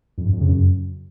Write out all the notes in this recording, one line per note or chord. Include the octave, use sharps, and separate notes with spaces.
F2
G2
F2
C#3
F#2